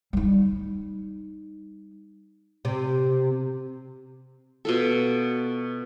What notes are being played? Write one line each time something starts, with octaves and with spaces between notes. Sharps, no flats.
G3 D#4
C3
B2 F4 A4